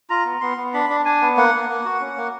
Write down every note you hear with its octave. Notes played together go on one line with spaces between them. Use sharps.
F4 A#5
B3
B3 C6
B3
D4 B5
D4
D4 G#5
B3
A#3 F#5
A#3
A#3
F#4
C#4
A#3